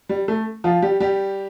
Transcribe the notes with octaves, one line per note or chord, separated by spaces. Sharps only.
G3
A3
F3 F4
G3 G4
G3 G4